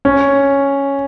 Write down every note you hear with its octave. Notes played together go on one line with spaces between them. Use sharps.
C#4